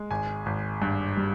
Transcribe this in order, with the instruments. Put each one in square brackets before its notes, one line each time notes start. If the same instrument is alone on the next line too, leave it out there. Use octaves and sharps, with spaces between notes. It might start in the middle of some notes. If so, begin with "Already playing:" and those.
Already playing: [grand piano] G#3
G#1 G#5
G#1
G2
G3